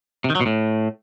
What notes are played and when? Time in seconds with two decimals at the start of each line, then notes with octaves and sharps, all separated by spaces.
0.24 C3
0.30 D#3
0.35 F#3
0.41 B2
0.46 A2